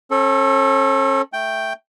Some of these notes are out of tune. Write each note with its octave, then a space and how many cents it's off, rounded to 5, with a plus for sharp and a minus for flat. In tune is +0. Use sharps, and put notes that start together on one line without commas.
C#4 -40 A4 +0
A3 +0 G5 +0